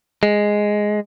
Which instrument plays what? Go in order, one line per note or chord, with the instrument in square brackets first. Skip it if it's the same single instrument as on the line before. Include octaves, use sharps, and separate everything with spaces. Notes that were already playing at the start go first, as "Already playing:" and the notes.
[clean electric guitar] G#3